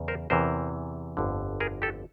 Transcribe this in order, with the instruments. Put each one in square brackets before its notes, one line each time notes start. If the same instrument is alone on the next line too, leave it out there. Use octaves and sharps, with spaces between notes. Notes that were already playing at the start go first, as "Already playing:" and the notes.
Already playing: [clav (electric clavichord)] E2 C#3
A#4 C5
E2 C3 E3 A#4 C5
G1 F2 D3
G#4 A#4
G4 A4